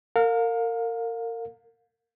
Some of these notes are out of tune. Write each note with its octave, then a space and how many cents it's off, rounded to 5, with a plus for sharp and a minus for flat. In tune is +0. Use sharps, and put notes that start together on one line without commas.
A#4 -30 F5 +25